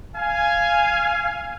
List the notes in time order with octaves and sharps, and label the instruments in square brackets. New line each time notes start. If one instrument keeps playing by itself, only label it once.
[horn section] F5 G#5